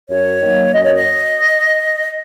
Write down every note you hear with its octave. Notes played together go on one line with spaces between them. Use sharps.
F#2 C#5
D#3 F#3 A#3
F#2 D#5
C#5
D#5